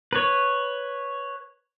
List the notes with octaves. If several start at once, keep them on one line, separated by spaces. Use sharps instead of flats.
B4 C#5